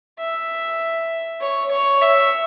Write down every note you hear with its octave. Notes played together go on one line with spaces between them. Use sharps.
E5
C#5
C#5
E5